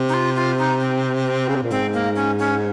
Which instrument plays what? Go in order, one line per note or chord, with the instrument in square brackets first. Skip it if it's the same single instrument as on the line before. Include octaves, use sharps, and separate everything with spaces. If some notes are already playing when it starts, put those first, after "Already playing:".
Already playing: [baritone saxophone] C3
[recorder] D#4
F4
F4
D#4
C4
C4
[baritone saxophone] C#3
C3
A#2
[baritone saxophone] G#2 [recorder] C4
[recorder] A#3
C#4
C#4